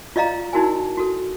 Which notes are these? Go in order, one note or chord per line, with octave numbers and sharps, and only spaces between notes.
F4 D5 D#5 F5 A#5
D#4 E4 F#4 A#4 G#5
F#4 A4